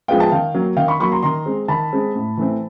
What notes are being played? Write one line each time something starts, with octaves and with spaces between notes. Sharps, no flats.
F3 G#3 B3 F5 G5
G5 A5
D#3 F5 G5
F#3 A#3
D#3 F5 G5
B5 C#6
F#3 A#3 B5 C#6
A#5 C6
D#3 A#5 C6
G#3 C4
D#3 A5 B5
G#3 C4
A2
E3 A3 C4